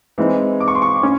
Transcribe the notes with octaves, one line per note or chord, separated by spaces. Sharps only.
E3 G#3 C4 D#4
D6
C#6
C6
C#6
C#4